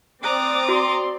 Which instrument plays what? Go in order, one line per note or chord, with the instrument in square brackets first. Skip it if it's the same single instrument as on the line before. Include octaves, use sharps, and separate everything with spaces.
[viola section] C4 D5 [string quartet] A#5 D6 D#6 [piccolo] F#6
[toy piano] F#4 [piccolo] C6